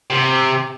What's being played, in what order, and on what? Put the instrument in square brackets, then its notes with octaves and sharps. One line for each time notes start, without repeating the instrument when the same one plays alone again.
[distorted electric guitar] C3